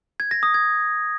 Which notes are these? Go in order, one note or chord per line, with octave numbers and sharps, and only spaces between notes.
G#6
A#6
D#6
G#6